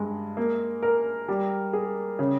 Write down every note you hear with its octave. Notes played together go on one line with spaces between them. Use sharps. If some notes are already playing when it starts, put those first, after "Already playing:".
Already playing: G2 G#3
A#3
A#4
G3
G#4
C#3